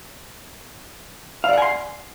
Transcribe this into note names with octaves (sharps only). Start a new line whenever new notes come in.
D5 F5 F#5 G#5 C6